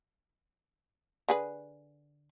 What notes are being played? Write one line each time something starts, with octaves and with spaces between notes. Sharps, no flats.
D3 G#4 B4